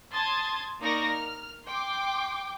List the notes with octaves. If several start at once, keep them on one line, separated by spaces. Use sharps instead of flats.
A5 C6 D#6 G#6 A6
A#3 D#4 A#4 D5 C#6 A#6
F6
G5 C6 D6